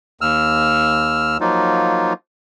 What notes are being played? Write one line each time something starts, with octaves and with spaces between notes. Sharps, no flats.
D#2 E6 F6
F3 F#3 A#3 D#4 F4